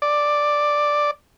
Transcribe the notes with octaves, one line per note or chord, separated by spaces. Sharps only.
D5